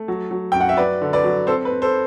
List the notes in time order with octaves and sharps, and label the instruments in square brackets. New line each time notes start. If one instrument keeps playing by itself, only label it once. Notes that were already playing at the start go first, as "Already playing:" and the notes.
Already playing: [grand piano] A3
F#3
F#3
F#2 G5
F#5
E5
F#3 B4 D5
D3
B4 D5
F#3
C4 A4 C5
B4
C4
A4 C5